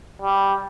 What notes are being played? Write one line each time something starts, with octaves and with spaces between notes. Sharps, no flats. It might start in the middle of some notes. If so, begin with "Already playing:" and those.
G3